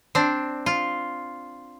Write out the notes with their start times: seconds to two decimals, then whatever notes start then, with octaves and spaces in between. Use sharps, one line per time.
0.15 C4 D4
0.66 F4